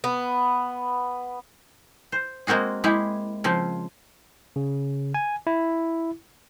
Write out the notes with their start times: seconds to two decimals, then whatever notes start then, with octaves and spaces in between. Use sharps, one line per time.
0.04 B3
2.12 C5
2.47 G#3 A#3 C4 F#4 G#4
2.84 G#3 E4 G4
3.44 C#3 F3 C4
4.56 C#3
5.14 G#5
5.47 E4